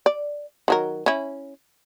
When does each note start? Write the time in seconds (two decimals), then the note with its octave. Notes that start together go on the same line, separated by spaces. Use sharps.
0.06 D5
0.68 D#3 F#3 A#4
1.06 C#4 E4